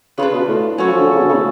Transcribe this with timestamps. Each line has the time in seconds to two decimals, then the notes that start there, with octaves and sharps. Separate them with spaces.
0.18 C#3 D4 F4 B4
0.33 B2
0.48 A2
0.78 F#3 C#4 F#4 A4 C#5
0.89 F3
0.98 D3
1.09 C#3
1.19 B2
1.29 C#3
1.35 A2